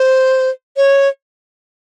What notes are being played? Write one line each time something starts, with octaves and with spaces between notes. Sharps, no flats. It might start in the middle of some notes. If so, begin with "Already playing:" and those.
Already playing: C5
C#5